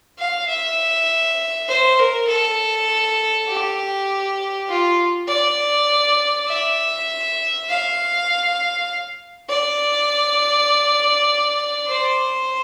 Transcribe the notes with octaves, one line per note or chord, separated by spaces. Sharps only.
F5
E5
C5
A#4
A4
G4
F4
D5
E5
F5
D5
C5